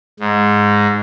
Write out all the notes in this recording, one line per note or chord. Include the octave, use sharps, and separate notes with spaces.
G#2